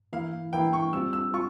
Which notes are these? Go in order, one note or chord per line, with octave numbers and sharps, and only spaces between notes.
E3 A#3 E4 F5
E3 A#3 E4 G5
C#6
G3 C4 F4 E6
E6
F4 C#6